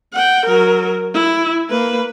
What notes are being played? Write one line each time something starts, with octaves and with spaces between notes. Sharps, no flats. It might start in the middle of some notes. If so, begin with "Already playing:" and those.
F#5 G5
F#3 A#4
E4
A#3 B4